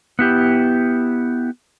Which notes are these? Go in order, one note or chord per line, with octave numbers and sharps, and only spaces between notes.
B3 E4 G4